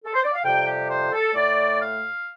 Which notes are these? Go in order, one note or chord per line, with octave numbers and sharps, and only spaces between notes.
A4
C5
D5
F5
F2 C3 G3 G5
G4
C5
A4
A2 A3 D5
F5